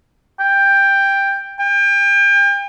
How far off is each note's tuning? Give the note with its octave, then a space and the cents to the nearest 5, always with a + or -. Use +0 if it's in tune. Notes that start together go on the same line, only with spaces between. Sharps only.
G5 +10
G5 +35